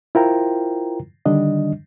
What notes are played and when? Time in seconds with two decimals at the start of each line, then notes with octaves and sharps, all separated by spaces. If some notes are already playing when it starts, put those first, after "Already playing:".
0.15 E4 F4 A#4 C5 G5 A#5
1.26 D3 D#3 G3 D4 D#5